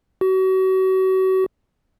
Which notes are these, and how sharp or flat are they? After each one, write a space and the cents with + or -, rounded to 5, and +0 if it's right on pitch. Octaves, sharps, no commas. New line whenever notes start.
F#4 +35